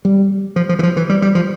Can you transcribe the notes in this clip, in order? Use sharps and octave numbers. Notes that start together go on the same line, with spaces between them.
G3
F3
F3
E3
F3
E3
G3
G3
F3